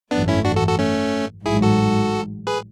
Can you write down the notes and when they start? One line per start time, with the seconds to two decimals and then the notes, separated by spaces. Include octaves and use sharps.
0.11 G#1 F#2 E3 A3 B3 D4
0.28 C#4 E4
0.45 D4 F#4
0.56 F#4 A4
0.67 F#4 A4
0.79 A3 C#4
1.46 A1 G#2 F#3 E4 G#4
1.62 F#4 A4
2.47 G#4 B4